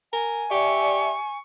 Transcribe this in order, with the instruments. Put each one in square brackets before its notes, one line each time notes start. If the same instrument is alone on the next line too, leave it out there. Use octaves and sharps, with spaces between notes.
[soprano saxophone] A#4 [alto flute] G#5
[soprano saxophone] G4 [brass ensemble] D5 E5 [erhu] C#6